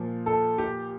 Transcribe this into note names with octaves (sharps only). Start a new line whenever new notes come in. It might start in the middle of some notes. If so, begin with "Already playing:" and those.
Already playing: A#2 F3
A4
G4